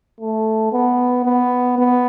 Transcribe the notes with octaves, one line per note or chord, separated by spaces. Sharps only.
A3
B3
B3
B3